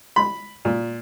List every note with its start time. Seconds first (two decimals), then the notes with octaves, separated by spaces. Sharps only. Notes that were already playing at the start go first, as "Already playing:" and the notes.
0.16 B5
0.65 A#2